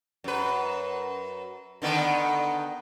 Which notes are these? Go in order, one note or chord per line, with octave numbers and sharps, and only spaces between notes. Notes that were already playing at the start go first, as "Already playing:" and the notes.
F#2 B4
D3 D#3 B3